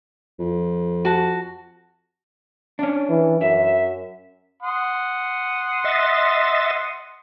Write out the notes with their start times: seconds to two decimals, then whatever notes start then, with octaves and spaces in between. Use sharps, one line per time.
0.40 F2
1.05 F#4 A5
2.79 C#4 D4
3.09 E3
3.41 F#2 E5
4.63 F#5 C6 D#6
5.84 D#5 E5 A6